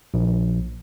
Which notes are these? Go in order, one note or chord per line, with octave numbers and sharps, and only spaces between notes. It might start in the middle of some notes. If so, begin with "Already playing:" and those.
A#1